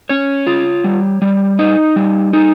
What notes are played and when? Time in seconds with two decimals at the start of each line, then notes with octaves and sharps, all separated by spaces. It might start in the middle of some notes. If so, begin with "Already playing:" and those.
0.09 C#4 C#5
0.47 F4
0.84 G3
1.22 G3
1.59 D#4 D#5
1.96 G3
2.33 D#4